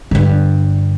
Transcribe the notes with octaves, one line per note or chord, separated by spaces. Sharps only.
G2 D3